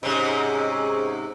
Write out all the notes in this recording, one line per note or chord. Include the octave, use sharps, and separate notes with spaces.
G#2 C3 C#4 D#4 G#4